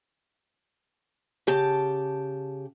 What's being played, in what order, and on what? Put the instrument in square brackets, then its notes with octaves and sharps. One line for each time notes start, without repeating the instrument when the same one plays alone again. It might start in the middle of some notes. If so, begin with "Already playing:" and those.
[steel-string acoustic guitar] C#3 G4 A5